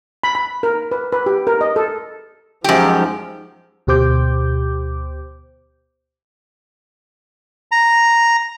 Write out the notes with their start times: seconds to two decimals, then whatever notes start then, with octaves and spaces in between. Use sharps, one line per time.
0.24 B5
0.35 B5
0.63 A#4
0.91 B4
1.12 B4
1.26 G4
1.47 A#4
1.61 D#5
1.76 A4
2.64 F#2 F3 G#3 D#4 G4
3.87 D2 B2 G4 C5 D6 G6
7.72 A#5